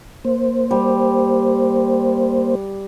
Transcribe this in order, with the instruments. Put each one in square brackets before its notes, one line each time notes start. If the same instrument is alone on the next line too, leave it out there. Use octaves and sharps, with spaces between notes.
[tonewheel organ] A#3 C5
[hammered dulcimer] G3